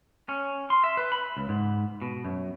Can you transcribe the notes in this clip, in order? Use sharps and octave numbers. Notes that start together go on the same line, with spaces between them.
C#4
C6
E5
B4
B5
C#2
G#2
B2
F#2